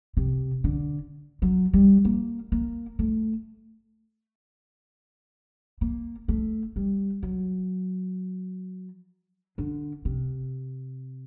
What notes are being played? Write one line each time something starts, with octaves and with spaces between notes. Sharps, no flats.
C3
D3
F#3
G3
A#3
A#3
A3
A#3
A3
G3
F#3
D3
C3